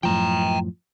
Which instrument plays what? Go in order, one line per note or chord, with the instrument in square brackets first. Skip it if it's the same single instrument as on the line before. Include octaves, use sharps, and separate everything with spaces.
[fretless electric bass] F#2 A2 F3 [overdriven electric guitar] G5 A#5